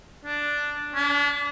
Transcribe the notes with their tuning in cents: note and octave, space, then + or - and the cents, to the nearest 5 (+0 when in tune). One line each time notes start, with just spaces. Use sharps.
D4 +0
D4 -35